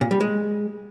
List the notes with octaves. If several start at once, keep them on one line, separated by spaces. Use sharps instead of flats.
A#2
G3
G#3